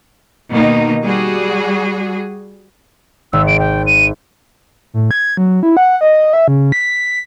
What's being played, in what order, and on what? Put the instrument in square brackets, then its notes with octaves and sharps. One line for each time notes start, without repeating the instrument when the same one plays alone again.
[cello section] B2 D#3 A#3 D#4
G3 F#4 G#4
[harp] G#1 [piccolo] E6
[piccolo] D7
G5
D#7
[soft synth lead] A2
G#6
F#3
E4
F#5
D#5
E5
C#3
B6